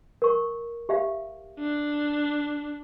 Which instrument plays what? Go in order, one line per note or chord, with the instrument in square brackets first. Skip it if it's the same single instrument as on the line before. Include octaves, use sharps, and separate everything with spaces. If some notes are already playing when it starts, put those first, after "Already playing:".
[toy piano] A#4 C#6
G4 E5 F5
[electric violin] D4